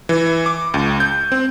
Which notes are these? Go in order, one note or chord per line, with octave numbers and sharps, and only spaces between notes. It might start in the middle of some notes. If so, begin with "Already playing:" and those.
E3
D6
C#2
G6
C4